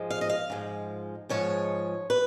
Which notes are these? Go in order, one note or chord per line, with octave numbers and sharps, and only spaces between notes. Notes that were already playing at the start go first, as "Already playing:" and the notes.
Already playing: G#2 F3 G#3
F5
D#5
F5
G#2 F3 G#3
G#2 F3 G#3 C#5
B4